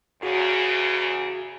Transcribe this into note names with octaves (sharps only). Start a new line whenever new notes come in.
E2 C#3 F#4 G#4